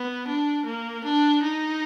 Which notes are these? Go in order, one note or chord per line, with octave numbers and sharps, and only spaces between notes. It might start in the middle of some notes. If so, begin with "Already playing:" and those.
Already playing: B3
D4
A#3
D4
D#4